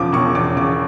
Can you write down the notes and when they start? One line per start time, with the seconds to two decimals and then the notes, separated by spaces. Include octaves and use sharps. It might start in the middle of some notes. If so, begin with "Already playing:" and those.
Already playing: E1 E2 C#3 F3 D6
0.13 E1 C#6
0.35 E2 D6
0.56 C#3 D6